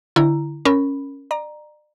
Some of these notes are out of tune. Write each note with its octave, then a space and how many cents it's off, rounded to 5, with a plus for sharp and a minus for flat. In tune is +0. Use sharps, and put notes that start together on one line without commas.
D3 +0 E4 +15 A#5 +0
C#4 +0 A#4 +0 B5 +0
D5 +40 A#5 +10